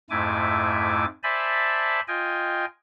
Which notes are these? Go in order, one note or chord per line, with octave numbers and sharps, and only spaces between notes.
F2 G#2 A3 E4 G#5 D6
C5 D5 E5 G#5 A5 B5
F4 D#5 G5 G#5